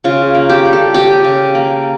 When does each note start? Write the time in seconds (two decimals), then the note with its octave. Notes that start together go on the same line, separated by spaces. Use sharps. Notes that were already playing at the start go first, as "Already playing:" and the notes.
0.04 C#3 F4
0.35 A#3
0.49 G4
0.66 G3
0.73 A4
0.94 C#3 G4
1.24 C#3
1.55 A#3